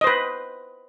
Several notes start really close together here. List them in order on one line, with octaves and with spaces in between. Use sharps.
D#5 C5 B4